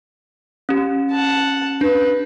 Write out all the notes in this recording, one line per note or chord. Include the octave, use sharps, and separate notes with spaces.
C#4 G4
F#5 A5
D4 B4